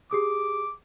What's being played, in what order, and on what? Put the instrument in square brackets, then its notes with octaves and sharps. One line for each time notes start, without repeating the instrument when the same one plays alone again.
[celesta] G4 G#4 D#6 [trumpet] D6